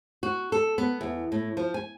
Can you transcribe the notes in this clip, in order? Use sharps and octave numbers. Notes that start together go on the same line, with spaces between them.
F#4
A4
B3
E2
A2
F3
G#5